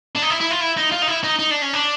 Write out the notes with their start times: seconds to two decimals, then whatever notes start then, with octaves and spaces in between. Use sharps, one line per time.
0.16 D4
0.22 D#4
0.31 E4
0.41 E4
0.51 F4
0.61 E4
0.78 D#4
0.92 F4
1.02 D#4
1.08 E4
1.24 D#4
1.39 D#4
1.51 D4
1.62 C#4
1.73 D4